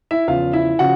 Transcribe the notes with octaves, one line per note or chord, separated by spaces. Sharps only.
E4 E5
E2 C#3 F3 F4 F5
E4 E5
C#3 F3 F#4 F#5